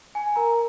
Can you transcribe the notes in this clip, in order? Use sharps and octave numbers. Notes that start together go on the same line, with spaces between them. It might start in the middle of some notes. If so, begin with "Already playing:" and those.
G#5
A#4 A#5